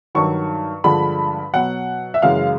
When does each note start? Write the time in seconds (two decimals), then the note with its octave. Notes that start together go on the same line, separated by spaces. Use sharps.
0.15 G2 D#3 F#3 C#6
0.84 G2 D3 F3 G#3 B5
1.54 B2 F#3 F#5
2.14 E5
2.22 F#2 C#3 E3 G#3 F5